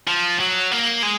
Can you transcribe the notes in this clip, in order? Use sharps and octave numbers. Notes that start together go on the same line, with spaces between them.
F3
F#3
A#3
G#3